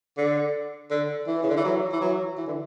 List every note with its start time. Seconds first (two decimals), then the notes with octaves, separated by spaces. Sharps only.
0.18 D3
0.91 D3
1.27 E3
1.43 C#3
1.49 D3
1.57 E3
1.65 F#3
1.92 E3
2.01 F#3
2.37 E3
2.47 D3